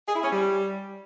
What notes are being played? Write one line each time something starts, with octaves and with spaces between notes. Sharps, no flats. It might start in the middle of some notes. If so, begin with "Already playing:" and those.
G#4
E4
C#4
G3